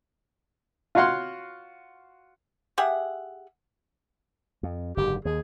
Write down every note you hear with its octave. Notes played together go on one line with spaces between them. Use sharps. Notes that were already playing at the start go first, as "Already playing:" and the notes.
F4 F#4 C#5 F5 F#5 C6
G4 G#4 E5 F#5
F2
F#1 G#2 D3 G4
D#2 G#4